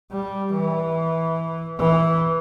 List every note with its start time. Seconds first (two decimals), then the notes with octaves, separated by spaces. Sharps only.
0.11 G3
0.53 E3
1.79 E3